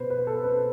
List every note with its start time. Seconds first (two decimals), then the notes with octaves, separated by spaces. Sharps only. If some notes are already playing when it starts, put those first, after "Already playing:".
Already playing: B2 B4 C5
0.10 B4
0.27 A4
0.44 B2 B4